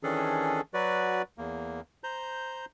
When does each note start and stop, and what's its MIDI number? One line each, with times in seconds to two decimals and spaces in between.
0.03 0.61 51
0.03 0.61 52
0.03 0.61 61
0.03 0.61 62
0.03 0.61 68
0.03 0.61 69
0.74 1.22 54
0.74 1.22 66
0.74 1.22 71
0.74 1.22 74
1.38 1.81 40
1.38 1.81 58
2.04 2.65 72
2.04 2.65 82
2.04 2.65 91